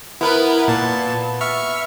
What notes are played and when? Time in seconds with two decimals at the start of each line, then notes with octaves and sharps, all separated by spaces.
0.21 B3 E4 A#4 B4
0.68 A#2 A5
1.41 E5 C#6 F6